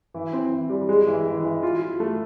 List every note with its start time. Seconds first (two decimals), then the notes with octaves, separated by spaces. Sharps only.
0.14 E3
0.33 C4
0.51 E3
0.69 G3
0.89 G#3
1.07 E3
1.26 E3
1.44 E3
1.63 F4
1.81 F4
2.00 A3